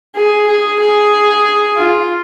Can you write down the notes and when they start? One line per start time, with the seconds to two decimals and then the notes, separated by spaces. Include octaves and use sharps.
0.16 G#4
0.47 G#4
0.80 G#4
1.77 F4